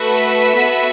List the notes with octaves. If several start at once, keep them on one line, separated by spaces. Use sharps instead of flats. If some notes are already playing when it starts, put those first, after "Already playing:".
Already playing: A3 F#4 A4 B4 E5
B3 F#4 A4